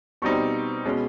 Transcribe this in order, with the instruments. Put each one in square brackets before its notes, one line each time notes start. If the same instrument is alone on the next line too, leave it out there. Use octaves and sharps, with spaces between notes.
[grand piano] B2 G3 C4 D#4 C#6
B2 G#3 C#4